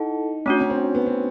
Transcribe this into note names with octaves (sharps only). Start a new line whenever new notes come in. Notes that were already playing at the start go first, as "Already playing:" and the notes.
Already playing: D#4 E4 A4 F#5 A5
A3 C#4 D4 F#4
C#4
C4
B3
C4